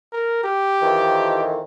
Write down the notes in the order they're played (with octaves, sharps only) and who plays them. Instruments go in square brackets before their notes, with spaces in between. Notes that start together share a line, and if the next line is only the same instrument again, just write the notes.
[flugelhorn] A#4
G4
[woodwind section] F2 D#3 E3